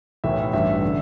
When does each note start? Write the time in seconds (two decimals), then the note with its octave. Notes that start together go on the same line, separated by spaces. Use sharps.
0.24 B1 A2 E3 E5
0.53 A1 G2 E3 E5
0.85 D3